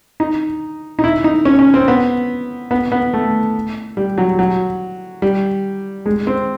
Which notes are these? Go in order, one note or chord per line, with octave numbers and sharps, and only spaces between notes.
D#4
D#4
E4
D#4
C#4
C#4
C4
B3
B3
B3
A3
G3
F#3
F#3
G3
G#3
C4